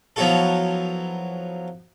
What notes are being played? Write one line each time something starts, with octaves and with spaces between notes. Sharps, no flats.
F3 F#3 B3 E4 F#4 A4